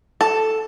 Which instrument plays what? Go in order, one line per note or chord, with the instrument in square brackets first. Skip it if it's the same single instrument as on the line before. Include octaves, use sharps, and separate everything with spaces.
[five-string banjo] A4